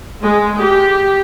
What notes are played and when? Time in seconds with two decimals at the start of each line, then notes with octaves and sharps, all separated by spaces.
0.22 G#3
0.59 G4